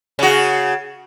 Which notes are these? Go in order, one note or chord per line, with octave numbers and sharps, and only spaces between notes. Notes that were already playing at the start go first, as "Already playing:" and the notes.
C#3 F#4